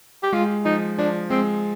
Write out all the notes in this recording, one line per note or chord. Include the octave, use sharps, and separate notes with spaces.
G4
G#3 F4
F3 D#4
F3 D4
G#3 C4